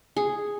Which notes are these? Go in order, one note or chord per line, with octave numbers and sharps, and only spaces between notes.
G#4